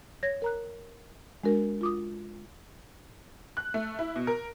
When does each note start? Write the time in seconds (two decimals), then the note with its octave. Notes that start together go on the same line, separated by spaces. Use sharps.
0.23 C#5 G#6 A#6
0.42 A#4 A#5 F#6
1.44 G#3 D4 F#4 A#4
1.81 F4 D6 D#6
3.57 F#6
3.74 A3
3.99 E4
4.16 B2
4.27 A#4